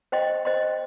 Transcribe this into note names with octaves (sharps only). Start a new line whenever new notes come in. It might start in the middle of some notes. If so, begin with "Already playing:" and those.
C5 D#5 G5 C6
C5 D#5 G5 C6